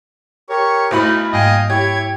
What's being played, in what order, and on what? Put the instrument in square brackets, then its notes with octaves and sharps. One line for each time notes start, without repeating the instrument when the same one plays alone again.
[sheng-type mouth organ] G4 A#4 C#5 [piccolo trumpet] C#6
[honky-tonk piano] B1 A3 B5 [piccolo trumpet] D#4 [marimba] E4 F#4 C5 [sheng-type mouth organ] D#6
[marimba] G#2 G3 A#3 [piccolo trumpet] D#5 [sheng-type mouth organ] F5 G5 G#5
[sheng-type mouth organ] E4 C#5 [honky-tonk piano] G4 [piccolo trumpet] G#6